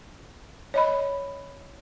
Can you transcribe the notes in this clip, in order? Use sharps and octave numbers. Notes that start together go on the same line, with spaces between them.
C#5 D#5 B5